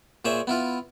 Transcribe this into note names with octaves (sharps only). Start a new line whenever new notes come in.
A#2 G#4 C5 C#5 E5
B3 E4 F4